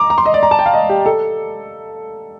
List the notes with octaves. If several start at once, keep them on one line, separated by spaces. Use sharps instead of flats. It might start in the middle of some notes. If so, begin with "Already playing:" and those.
Already playing: A#5 D6
A#5
C6
D#5
D5
A#5
A5
G5
F5
D#5
G4
A4